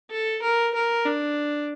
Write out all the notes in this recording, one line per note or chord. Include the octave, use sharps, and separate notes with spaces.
A4
A#4
A#4
D4